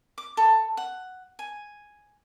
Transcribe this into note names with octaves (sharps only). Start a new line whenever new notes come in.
D6
A4
F#5
G#5